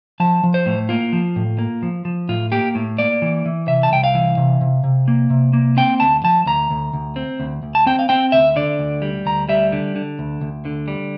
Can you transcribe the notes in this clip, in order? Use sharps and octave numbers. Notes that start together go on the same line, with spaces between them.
F3 A5
F3
C5
A2
A#3 F4
F3
A2
A#3
F3
F3
A2 F4
A#3 G4
A2
A#3 D5
E3
E3
C3 E5
A5
C2 G5
F5
E3
C3
C3
C3
A#3
C3
A#3
C4 G5
D2 A5
F3 A5
D2 A#5
D2
D2
C4
D2
D2
A5
C4 G5
F5
C4 G5
D2 E5
D3 D5
D2
G3
D2 A#5
G3 E5
D3
D3
D2
D2
D3
G3